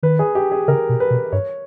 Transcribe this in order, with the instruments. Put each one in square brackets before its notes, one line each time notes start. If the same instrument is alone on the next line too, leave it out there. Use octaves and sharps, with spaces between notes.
[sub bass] D#3 [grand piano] B4
[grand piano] G#4
G4
G#4
[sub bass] C#3 [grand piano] A#4
[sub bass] B2
[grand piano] B4
[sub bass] B2
[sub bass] G2 [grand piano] C#5